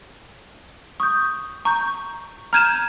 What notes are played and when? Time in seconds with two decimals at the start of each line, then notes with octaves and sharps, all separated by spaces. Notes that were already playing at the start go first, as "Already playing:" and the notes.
1.00 C#6 D#6 G6
1.65 A#5 C#6 G6
2.53 A#5 F6 G6 G#6 D#7 E7